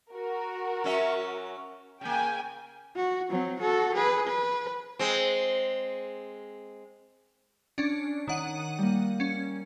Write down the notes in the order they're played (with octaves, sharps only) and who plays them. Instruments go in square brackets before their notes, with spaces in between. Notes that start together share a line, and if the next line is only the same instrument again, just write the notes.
[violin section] F#4 A#4
[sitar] F#3 C#4 E5
[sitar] C#3 A#3 [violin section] G5 G#5
[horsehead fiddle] F#4
F#3 C4
F#4 A4
G#4 B4
B4
[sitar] G#3 C4
[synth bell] C#4 D4
[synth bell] D#3 F#5 D#7 [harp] C#5 D#6
[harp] G3 A#3
[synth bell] C#4